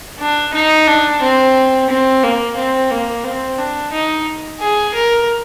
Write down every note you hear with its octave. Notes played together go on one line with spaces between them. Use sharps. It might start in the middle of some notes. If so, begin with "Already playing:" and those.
D4
D#4
D4
C4
C4
A#3
C4
A#3
C4
D4
D#4
G#4
A#4